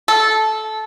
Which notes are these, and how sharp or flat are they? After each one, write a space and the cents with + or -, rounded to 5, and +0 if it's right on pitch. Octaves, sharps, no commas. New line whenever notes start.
A4 -15